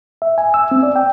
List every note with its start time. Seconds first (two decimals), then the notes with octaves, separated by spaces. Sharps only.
0.22 E5
0.38 G#5
0.54 E6
0.71 C4
0.83 D5
0.96 G5